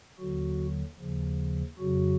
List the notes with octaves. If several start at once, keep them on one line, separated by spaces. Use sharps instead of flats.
D#2 D3 F#3 F#4
D#2 C#3 F3
F2 C#3 F#3 F#4